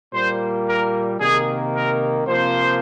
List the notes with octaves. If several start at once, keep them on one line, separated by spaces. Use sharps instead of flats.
A#2 G3 A#3 C5
A#4
C3 D#3 A#3 G#4
A#4
C3 F3 A#3 C5